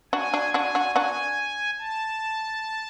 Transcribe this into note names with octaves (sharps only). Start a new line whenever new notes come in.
D4 F#4 G#5
D4 F#4
D4 F#4 G#5
D4 F#4
D4 F#4 G#5
A5